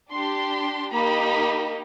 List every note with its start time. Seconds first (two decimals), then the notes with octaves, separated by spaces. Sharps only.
0.10 D4 G4 C6
0.92 A#3 D#4 G4 B5